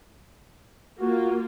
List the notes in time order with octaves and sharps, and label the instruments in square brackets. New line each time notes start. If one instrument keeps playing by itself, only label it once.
[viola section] A#3 F4 [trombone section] F#4